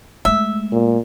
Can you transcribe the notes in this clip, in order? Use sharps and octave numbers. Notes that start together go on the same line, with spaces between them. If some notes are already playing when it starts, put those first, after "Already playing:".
G#3 A3 E5
A#2